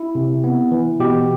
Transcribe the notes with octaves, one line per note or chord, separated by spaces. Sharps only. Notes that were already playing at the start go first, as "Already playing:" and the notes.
Already playing: E4
C3
B3
E3
B2 G4